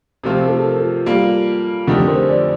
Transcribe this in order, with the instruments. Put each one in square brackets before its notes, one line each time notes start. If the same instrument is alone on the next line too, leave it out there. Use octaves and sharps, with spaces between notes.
[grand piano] C3 F3 A3 C4 F4
[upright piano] A4
A#4
A4
[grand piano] G3 A#3 F4
[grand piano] F2 D3 A3 D#4 G4 [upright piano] A#4
[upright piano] C5
D5